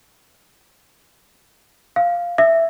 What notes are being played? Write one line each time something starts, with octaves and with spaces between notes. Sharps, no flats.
F5
E5